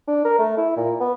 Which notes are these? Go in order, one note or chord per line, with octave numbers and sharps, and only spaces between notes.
D4
A#4
A3
E4
A#2
B3